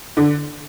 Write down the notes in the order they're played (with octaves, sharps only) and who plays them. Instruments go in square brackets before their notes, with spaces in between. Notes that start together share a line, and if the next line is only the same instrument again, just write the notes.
[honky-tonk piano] D3